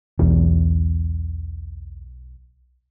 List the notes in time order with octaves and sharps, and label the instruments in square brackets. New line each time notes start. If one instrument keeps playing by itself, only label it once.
[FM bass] B1 [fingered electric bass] E2